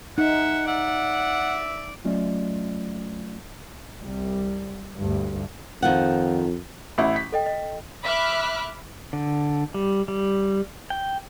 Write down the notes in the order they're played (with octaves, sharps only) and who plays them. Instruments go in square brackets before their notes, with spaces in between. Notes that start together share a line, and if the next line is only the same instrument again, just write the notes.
[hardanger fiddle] G#3 E5 [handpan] D#4 [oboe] F#5
[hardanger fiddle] D5 [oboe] E5 [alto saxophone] F#5
[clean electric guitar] F#3 A3 C#4 F4 D5 D#5
[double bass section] C2 G3
D2 G2
[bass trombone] F2 [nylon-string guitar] D#3 F3 F#5
[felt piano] A1 E4
B6
[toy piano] A4 D#5 G5
D#5
[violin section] E5 B5 D6 F6 F#6
[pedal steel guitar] D3
G3
G3
G5